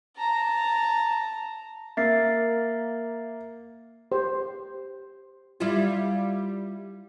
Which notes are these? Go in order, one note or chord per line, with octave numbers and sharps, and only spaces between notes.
A5 A#5
A#3 E5 A6 C7
G4 C5
G3 E4 F4